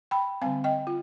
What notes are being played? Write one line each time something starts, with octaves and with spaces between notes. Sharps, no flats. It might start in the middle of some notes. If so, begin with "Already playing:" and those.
G5 B5
D3 G3 C4 F5 G#5
D#5 G5
F4